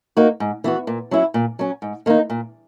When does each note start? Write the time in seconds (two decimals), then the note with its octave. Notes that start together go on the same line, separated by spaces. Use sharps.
0.17 A#3 D#4 F#4
0.40 G#2
0.64 E3 B3 F#4
0.87 A#2
1.11 F#3 C#4 E4
1.34 A#2
1.59 F#3 C#4
1.82 G#2
2.06 D#3 A#3 D#4
2.30 A#2